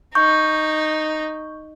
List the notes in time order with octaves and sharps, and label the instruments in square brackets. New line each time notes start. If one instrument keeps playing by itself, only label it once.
[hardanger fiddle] D#4 [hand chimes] C#6 G6